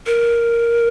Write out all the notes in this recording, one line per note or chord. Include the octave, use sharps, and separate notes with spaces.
A#4